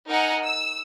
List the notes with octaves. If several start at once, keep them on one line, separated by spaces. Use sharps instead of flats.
D#4 A#4 F#5 G#5 A#5
E6